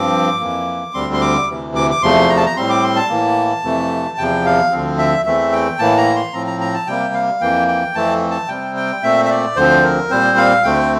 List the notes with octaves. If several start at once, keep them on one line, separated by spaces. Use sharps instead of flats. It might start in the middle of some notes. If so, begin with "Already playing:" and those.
Already playing: G2 F3 C4 D6
F2 E3 A#3
D2 D3 G3 C4 C6
C6
D6
D2 C3 E3
D6
D6
E2 C3 F3 A3 C6
A#5
A5
A#5
A2 G3 C4 C6
D6
C6
A5
A2 E3 A#3
F2 C3 E3 A3
E2 C3 F3 G5
F5
D2 D3 F3 C4
E5
E2 E3 A3 C4 E5
G5
A2 E3 A#3 A5
A#5
C6
A2 F3 C4 A#5
A#5
A#5
A5
C3 G3 A#3 G5
F5
F2 E3 A#3 G5
G5
F2 E3 A3 C4 A5
A5
C3 G3 C4 G5
G5
A#2 A3 C4 E5
E5
D5
D2 D3 F3 C4 C5
A#4
A#2 G3 C4 C5
F5
D2 D3 A3 C4 G5